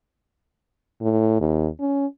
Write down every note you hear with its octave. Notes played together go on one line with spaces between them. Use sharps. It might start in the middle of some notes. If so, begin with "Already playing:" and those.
A2
D#2
C#4